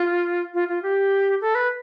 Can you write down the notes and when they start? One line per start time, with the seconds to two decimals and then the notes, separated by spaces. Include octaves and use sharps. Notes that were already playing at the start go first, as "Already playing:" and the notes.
Already playing: F4
0.54 F4
0.69 F4
0.83 G4
1.41 A4
1.55 B4